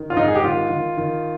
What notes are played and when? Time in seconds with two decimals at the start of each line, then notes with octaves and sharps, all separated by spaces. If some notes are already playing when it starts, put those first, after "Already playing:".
Already playing: D#3
0.10 F4
0.16 G#2 D#4
0.28 G#4
0.35 G4
0.43 D#3 F4
0.70 D#3
0.97 D#3